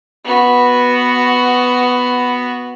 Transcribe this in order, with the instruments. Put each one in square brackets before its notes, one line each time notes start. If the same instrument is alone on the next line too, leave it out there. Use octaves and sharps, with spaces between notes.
[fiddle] B3 F#4